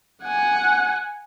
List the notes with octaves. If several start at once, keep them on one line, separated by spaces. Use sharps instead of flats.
F#5 G#5